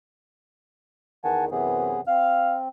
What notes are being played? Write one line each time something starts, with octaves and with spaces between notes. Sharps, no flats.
E2 D#3 F#5 G#5 A5
F#2 C3 E3 B3 G#4
C4 F5